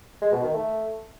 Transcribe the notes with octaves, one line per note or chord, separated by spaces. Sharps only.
G#3
B2
D#3
A3